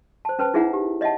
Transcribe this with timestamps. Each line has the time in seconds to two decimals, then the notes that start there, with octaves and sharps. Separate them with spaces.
0.25 C5 A5
0.39 C#4 B4 C5 A5
0.54 D#4 E4 G#4 E5 F#5 A#5
0.73 G4
1.01 C#5 D#5 E5 F#5 A5